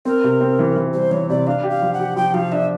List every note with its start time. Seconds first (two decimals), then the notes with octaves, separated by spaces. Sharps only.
0.05 C4 A#4
0.24 C3
0.41 C4
0.59 E3
0.76 E3
0.93 G3 C5
1.11 E3 C#5
1.29 C3 D5
1.47 D4 F5
1.63 G4
1.70 F5
1.82 F3
1.94 F#5
1.99 G4
2.16 F3 G5
2.34 F3 F5
2.52 D4 E5